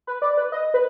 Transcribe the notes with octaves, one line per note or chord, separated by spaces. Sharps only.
B4
D5
B4
D#5
B4